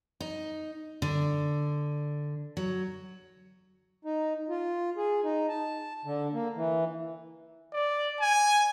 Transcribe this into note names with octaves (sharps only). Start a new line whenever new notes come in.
D#4
D3
F#3
D#4
F4
G#4
D#4
A5
D3
A#3
E3
D5
G#5